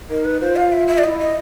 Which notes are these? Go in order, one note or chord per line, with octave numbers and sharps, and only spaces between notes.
D#4 A#4
B4
F4 C5
F5
E5
E5
D5
E4 D#5
D#5